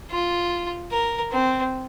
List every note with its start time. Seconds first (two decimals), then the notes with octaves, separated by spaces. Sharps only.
0.10 F4
0.91 A#4
1.32 C4